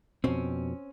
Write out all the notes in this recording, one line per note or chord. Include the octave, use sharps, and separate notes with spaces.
F2 B2 C4 C#4